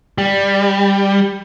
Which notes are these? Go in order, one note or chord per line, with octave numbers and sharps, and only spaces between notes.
G3